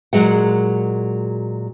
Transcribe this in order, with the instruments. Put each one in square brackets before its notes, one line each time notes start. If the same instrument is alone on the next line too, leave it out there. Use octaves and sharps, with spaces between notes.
[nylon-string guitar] A#2 D#3 F#3 G#3 F#5